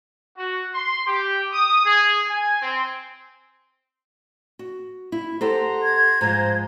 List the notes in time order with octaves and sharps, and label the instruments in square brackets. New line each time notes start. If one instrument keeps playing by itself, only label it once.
[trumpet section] F#4
C6
G4
D#6
G#4
G#5
C4
[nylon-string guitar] F#4
E4
[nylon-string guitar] G4 A4 C5 [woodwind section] F#5 A#5 C6
[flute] G#6
[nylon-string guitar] G#2 F3 G#3 [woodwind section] C5 A#5